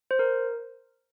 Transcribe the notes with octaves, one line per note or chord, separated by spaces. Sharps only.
C5
A#4